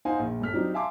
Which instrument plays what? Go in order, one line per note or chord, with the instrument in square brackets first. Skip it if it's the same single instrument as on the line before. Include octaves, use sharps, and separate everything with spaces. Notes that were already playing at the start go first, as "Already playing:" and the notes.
[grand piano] D#4 C5 F5 F#5 G#5
A#1
G1 A3 F6 B6
F#3 C4 D4 D#4 G4
E5 F5 G#5 A5 C6 D6